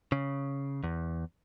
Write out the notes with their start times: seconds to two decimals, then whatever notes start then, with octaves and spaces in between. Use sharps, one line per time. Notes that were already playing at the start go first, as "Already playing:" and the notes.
0.12 C#3
0.83 E2